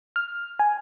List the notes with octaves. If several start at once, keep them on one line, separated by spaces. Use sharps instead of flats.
F6
G#5